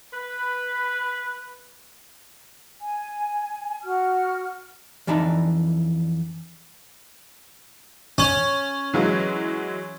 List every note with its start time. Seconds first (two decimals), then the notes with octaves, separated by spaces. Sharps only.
0.13 B4
2.80 G#5
3.82 F#4 F6
5.07 F2 E3 D4 D#4 A5
8.18 C#4
8.94 E3 F#3 G#3